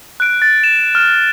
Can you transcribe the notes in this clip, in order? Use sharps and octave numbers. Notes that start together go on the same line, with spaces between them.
F#6 D7
A6
E7
F6 E7